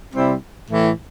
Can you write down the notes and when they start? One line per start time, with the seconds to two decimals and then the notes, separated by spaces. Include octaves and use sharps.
0.14 C3 G3 C4 E4
0.70 A2 E3 A3 E4